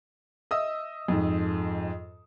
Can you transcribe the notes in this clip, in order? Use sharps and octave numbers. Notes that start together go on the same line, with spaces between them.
D#5 E5 D#6 E6
F2 G#2